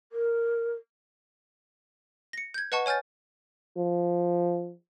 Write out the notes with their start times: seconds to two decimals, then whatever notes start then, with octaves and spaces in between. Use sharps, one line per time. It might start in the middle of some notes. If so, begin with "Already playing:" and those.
0.12 A#4
2.33 A#6 C#7
2.54 G6 G#6
2.72 B4 D#5 F#5 A5 C#6
2.86 C#5 G#5 F6 G6 A6
3.77 F3